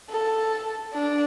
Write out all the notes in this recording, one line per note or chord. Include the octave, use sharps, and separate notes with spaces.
A4
D4